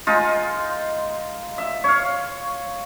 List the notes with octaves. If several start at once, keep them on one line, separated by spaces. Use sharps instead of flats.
G#3 D#4 F4
E5
C#5 F5